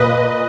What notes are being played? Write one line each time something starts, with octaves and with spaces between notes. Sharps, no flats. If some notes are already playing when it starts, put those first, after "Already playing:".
Already playing: A#2 B4 D#5